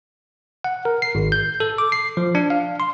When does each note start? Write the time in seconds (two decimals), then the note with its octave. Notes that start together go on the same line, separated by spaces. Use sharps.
0.64 F#5
0.85 A#4
1.02 C7
1.15 G#1
1.32 G6
1.60 A4
1.78 D6
1.92 C7
2.17 F3
2.35 D4
2.50 F5
2.80 C6